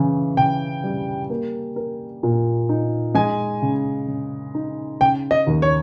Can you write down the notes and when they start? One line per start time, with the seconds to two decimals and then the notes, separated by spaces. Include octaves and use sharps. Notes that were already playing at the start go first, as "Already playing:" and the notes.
Already playing: C#3 E3
0.37 C#3 G5
0.84 G3
1.30 A#3
1.76 A#4
2.23 A#2
2.69 D#4
3.14 G#3 G#5
3.62 C#3
4.07 C#3
4.54 D#4
5.01 C#3 G5
5.31 D#5
5.47 D#2
5.62 C#5